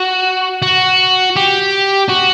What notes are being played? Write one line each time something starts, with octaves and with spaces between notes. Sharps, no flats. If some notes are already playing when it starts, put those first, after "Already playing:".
Already playing: F#4
F#4
G4
F#4